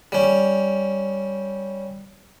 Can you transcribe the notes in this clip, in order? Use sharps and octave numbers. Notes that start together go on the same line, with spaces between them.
G3 C#4